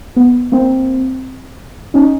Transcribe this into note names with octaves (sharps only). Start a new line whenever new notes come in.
B3
A#3 C4
C#4 D#4